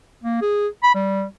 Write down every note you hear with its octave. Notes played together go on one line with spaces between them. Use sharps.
A#3
G#4
B5
G3